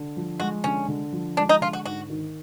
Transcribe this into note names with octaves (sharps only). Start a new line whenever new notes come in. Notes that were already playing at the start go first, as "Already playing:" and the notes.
Already playing: D3
F3
G#3 F#4
D3 C#4
D3
F3
G#3 D4
D#4
D3 F4
F#4
G#2 F#4
D#3